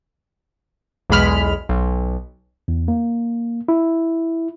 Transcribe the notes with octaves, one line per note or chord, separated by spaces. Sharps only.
B1 E2 G#3 B5 F6
B1
E2
A#3
E4